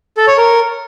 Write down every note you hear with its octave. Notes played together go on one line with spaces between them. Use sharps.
A4
C#5
A#4